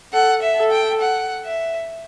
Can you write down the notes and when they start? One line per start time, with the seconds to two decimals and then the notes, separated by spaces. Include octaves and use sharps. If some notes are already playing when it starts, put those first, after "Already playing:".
0.13 A4 F#5
0.42 E5
0.56 A4
0.71 G5
1.01 F#5
1.45 E5